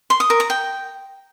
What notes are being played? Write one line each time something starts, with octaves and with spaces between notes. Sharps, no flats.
C6
D#6
A#4
A#5
G5